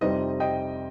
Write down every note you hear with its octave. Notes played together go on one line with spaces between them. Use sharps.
F2 C3 G3 C4 D#4 D#5
D#5 G5